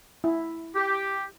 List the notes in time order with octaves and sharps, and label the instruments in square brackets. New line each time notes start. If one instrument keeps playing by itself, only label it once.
[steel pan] E4
[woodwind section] G4